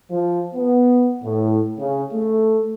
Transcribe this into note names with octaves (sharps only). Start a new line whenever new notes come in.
F3
B3
A2
C#3
A3